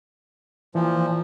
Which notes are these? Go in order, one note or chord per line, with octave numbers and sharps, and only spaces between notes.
A#2 E3 F3